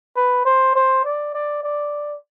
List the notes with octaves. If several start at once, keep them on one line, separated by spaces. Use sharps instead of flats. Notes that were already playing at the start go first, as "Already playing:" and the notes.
B4
C5
C5
D5
D5
D5